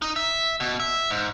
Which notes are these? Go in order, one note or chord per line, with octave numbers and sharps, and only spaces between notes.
D#4
E5
B2
E5
G#2